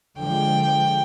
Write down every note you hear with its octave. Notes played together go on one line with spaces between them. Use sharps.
D3 F3 G#3 G5